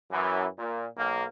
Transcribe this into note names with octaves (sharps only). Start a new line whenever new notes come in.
F#2 E3
A#2
B1 A#3